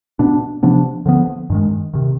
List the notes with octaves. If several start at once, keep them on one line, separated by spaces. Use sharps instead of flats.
B2 B3 D4
C3 F3 B3 D4
D3 F3 B3
G2 D#3 G#3
C3 D#3